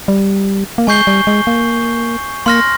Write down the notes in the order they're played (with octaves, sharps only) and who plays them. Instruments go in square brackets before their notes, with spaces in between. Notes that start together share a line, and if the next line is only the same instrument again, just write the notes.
[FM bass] G3
A#3
[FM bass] G#3 [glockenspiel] G#5 C#6 G6 C7 G7
[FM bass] G3
G#3
A#3
[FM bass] A#3 [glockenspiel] C6 F6 A#6